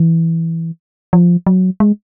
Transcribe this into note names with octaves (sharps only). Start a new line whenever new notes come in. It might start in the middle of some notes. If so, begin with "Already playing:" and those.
Already playing: E3
F3
F#3
G#3